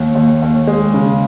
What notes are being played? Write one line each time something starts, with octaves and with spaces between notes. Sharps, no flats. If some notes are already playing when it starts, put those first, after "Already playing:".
Already playing: D#2
D#2
D#2
G#3
C#3